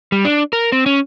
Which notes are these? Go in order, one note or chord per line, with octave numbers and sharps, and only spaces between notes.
G3
D4
A#4
C4
C#4